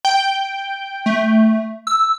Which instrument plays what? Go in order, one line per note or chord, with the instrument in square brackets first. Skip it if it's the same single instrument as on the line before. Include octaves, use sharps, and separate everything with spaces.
[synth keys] G5
[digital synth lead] A3
E6